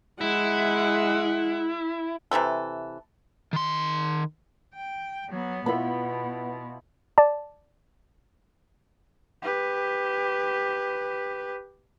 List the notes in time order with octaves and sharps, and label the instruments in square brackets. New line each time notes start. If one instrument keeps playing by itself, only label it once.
[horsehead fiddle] G#3 F#5 [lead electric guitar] E4
[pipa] C3 E3 G3 A4
[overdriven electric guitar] D#3 C6
[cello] G5
F#3 B3
[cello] B2 [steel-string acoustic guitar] B3 [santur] E4 F4 B5
[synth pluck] D5 A5
[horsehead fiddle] G4 B4